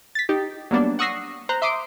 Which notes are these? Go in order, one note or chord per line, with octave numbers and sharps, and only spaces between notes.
A6 B6
D#4 G4
F#3 G3 A#3 B3 D4
F#5 C#6 D#6 E6 A#6 C7
C5 A#5 F#6
E5 C6 D6 D#6 C7 D7